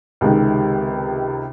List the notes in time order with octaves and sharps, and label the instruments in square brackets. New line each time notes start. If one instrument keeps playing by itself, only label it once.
[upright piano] C#2 C3 D#3 G#3 D#4